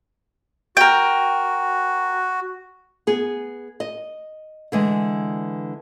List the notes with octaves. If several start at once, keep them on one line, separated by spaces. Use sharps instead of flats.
F#4 A#4 G5
B3 G#4
D#5
D3 E3 G#3